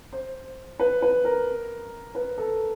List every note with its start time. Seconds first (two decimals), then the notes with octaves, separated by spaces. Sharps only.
0.13 C5
0.79 B4
1.02 B4
1.25 A#4
2.15 B4
2.38 A4